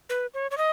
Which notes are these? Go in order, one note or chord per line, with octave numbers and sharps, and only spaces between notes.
B4
C#5
C#5
D#5